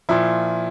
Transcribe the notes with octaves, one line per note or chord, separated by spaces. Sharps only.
A#2 F3 E4